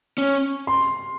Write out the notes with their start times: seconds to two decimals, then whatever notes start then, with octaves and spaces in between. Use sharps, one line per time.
0.18 C#4
0.67 C6